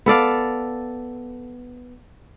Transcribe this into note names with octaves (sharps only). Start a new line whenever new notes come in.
B3 A4 D5 F5